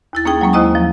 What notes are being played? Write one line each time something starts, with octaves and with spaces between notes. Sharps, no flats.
D#2 E4 A6
A#3 C#4 D#4 G#4 G5
F#3 G#3 A#3 C#4
D#2 E4 C5 D#5 A#5 D#6
F3